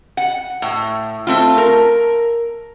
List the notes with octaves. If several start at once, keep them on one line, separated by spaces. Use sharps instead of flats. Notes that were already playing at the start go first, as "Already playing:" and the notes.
F#5
A2
A3 C4 F4
A#4